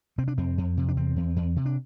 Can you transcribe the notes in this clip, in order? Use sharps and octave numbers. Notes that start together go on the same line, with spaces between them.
C3 C4
D4
F2 C4
F2
C3
D4
E2 C4
E2
E2
C3
D4